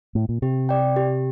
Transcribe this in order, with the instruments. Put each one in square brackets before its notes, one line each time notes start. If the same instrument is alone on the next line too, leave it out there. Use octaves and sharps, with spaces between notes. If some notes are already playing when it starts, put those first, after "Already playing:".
[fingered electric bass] A2
A#2
[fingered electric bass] C3 [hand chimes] G4
[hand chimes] D5 G5
G4